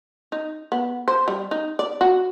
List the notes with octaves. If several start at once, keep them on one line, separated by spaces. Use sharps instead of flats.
D#4
B3
C5
G3
D#4
D5
F#4